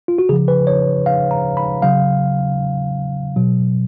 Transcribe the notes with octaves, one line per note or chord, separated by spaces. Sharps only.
F4
F#4
C#3 F3 G#4
B4
C#5
F5
A#5
B5
C#3 F#3 F5
B2 F#3